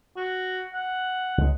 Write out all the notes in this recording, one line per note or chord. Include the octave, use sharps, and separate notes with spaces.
F#4
F#5
C#2 G#3